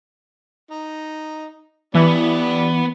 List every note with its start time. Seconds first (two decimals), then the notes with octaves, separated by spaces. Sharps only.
0.71 D#4
1.95 E3 G3 B3 D4 D5